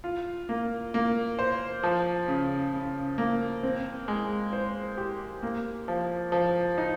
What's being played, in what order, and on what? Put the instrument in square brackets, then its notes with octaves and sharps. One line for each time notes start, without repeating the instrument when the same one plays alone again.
[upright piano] F4
A#3
A#3
C5
F3
C#3
C#3
A#3
C4
G#3
C5
G4
A#3
F3
F3
D#4